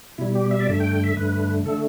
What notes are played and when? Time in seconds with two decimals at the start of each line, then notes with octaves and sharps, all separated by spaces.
0.18 B2 G3 E4
0.35 G4
0.51 E5
0.60 D5
0.67 G2 D3 A3 E5
0.80 G5
0.92 G5
1.04 E5
1.17 G2 D3 A3 B4
1.65 D3 A3 A4